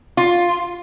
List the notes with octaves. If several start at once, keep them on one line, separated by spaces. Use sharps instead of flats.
F4